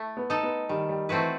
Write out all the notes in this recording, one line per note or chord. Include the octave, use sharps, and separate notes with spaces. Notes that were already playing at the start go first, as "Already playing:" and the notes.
Already playing: A3 E4
B3
D#4 A4
B3
D#3 G3
G3
E3 A3 C4 F#4 B4